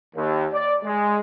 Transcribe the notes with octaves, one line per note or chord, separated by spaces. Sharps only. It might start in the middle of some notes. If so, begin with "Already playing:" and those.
D#2
D5
G#3